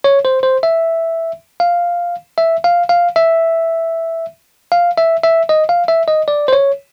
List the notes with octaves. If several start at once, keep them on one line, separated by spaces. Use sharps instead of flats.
C#5
C5
C5
E5
F5
E5
F5
F5
E5
F5
E5
E5
D#5
F5
E5
D#5
D5
C5
C#5